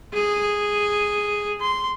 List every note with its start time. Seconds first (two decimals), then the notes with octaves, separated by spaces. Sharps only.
0.14 G#4
1.61 C6